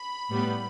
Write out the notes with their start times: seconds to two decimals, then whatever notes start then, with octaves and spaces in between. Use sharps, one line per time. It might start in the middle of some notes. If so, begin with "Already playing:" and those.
Already playing: B5
0.30 A2 G3 B3